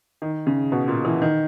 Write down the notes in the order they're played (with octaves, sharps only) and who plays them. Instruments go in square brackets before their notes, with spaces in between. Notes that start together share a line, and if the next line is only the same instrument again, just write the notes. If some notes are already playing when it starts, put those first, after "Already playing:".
[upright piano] D#3
C#3
B2
A#2
E3
D#3